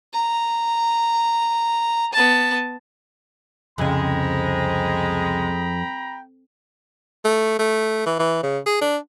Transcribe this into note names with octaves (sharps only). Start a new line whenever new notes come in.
A#5
B3 A5
C2 F2 C#3 G#3 G5 A#5 B5
A3
A3
E3
E3
C#3
G#4
D4